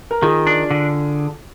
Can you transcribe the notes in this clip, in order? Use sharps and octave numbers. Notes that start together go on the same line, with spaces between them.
A#4
D#3 F4 G#4
D4
D3